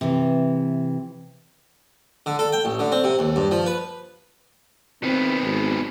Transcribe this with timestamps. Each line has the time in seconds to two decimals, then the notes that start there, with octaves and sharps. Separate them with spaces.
0.01 C3 E3
2.26 D3
2.39 A4
2.52 G5
2.65 A1
2.79 D3
2.92 C4
3.04 C3
3.19 D#2
3.36 G2
3.51 F3
3.66 B4
5.03 D#3 B3 C4
5.42 G#1